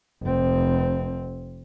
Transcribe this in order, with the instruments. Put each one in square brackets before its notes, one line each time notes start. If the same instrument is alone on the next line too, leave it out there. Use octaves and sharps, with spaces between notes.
[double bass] F1 C4